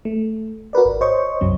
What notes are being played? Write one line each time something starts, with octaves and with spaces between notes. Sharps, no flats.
A3
F#4 A#4 B4 D5
G#1
C5 C#5 D#5 C#6
C2 F#2 F#3 C4